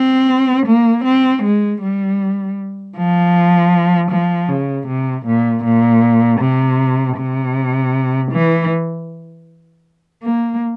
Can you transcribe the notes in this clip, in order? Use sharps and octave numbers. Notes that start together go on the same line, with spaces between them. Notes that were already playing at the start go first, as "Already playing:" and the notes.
Already playing: C4
A#3
C4
G#3
G3
F3
F3
C#3
C3
A#2
A#2
C3
C3
E3
A#3